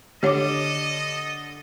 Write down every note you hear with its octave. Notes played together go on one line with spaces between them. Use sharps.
D3 G4 A4 C#5 D#5 D6